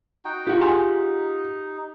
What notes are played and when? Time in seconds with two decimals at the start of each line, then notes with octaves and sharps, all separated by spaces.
0.25 D#4 F#4 G5
0.47 F4 G4 F#5
0.61 D#4 G#4 G#5 C6